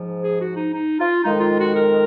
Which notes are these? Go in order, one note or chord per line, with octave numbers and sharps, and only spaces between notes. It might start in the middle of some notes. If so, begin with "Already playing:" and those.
Already playing: G#2 F3
G#4
F#4
D#4
D#4
F4
F2 D#3 G#3 D#4
F4
F#4
A#4